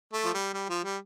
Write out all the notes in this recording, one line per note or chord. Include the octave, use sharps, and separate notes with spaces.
A3
F3
G3
G3
F3
G3